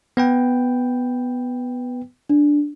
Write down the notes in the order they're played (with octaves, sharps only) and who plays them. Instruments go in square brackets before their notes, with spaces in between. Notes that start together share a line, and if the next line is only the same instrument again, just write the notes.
[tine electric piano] B3 B4 G5
[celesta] D4